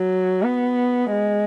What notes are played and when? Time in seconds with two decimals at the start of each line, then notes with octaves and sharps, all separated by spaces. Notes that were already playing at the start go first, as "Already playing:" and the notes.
Already playing: F#3
0.42 B3
1.12 G#3